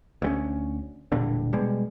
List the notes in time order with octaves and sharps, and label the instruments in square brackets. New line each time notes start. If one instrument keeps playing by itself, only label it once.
[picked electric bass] D2 G3 C#4
E1 G2 A#2 D3
B2 G3 G#3